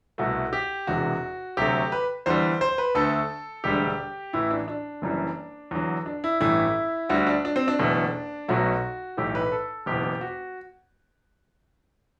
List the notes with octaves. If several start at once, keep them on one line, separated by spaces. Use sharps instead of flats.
C2 B2 A3 F#4
G4
E1 E2 C3 F#4
D2 C3 F#3 A3 G4
B4
E2 D3 G3 C5
C5
B4
D2 D3 A3 A4
E1 D2 D3 G3 G4
A1 A2 E3 E4
D4
D4
F#1 F#2 E3 G3
E2 D3 F#3
D4
E4
A1 G2 E3 A3 E4
D2 D3 G3 F#4
D4
D4
C4
D4
F#1 E2 B2 A3
B1 B2 F#3 A3 F#4
B1 A2 E3 A3 G4
B4
A4
F#1 E2 B2 G4
G4
F#4